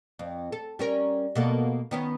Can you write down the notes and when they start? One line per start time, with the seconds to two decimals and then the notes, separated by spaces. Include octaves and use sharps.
0.19 F2
0.52 A4
0.79 G3 C#4 A#4
1.35 B2 A#3 A4
1.91 D#3 B3 C#4